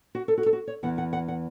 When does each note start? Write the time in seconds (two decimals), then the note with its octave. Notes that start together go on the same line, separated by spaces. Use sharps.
0.15 F#4
0.28 A4
0.38 F#4
0.46 A4
0.53 F#4
0.67 C#5
0.83 E2 E3 B3 F#5
0.98 F#5
1.13 F#5
1.28 F#5